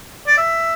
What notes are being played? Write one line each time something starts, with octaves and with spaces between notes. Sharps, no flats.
D5
E5